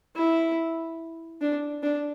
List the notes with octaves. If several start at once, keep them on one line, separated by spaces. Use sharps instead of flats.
E4
D4
D4